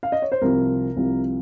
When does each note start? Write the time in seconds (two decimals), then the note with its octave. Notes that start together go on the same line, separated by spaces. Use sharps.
0.03 F5
0.12 D#5
0.22 C#5
0.32 C5
0.42 C2 C3 F3 A#4
0.97 C2 C3 F3